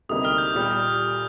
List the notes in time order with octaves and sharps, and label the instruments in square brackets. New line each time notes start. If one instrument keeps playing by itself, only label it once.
[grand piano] D2 C3 G3 A#3 D#4 [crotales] D#6
[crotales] F6
G6
[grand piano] A#2 G3